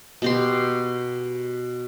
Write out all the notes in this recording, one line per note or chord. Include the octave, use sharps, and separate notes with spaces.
B2 G4 C6